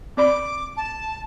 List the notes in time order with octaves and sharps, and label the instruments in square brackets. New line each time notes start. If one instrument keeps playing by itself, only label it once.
[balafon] C4 D5 B5 [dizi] D6
[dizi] A5